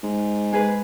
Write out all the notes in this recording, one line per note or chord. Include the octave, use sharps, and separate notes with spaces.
G#2
G#3 G#4 B4